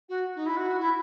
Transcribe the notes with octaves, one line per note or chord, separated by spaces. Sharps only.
F#4
D#4
E4
F#4
E4